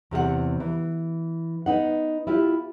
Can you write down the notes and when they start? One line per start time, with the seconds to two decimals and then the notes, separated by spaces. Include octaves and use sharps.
0.11 E2 C3 G#4 F#5
0.60 E3
1.66 B3 D#4 F#5
2.27 E4 F4 G4